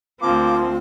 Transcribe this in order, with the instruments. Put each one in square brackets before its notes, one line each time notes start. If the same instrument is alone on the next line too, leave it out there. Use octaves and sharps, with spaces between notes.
[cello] D2 C4 [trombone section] F3 A#3 [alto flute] F4 [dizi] D6